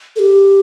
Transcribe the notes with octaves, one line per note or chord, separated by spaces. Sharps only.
A4
G4